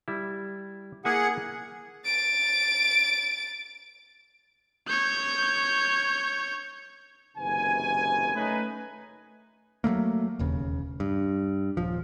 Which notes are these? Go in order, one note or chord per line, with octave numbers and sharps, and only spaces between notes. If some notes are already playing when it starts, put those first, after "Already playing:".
G3 E4
A#3 E4 G#4 F#5 G#5
A6 D7
C#5 G6
F#1 C3 D#3 B4 G#5
A3 C#4 D#4 B4
F#3 G3 A3 A#3
E1 D#2 C#3
G2
D#1 F3